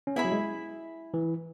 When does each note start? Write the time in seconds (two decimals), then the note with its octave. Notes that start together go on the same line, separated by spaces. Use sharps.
0.07 C#4
0.16 B3 E4 G#4 E5 B5
0.25 F#3
0.32 G#3
1.14 E3